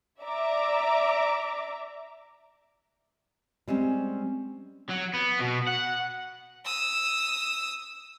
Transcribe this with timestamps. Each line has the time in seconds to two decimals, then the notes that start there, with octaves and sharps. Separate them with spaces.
0.22 D5 E5 A#5 D6
3.68 G3 G#3 C4 C#4
4.89 F#3
5.14 B3
5.40 B2
5.67 F#5
6.65 D#6 E6